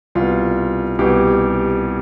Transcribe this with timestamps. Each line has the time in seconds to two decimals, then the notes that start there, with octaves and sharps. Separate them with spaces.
0.15 C2 B2 F4
0.99 C2 B2 G4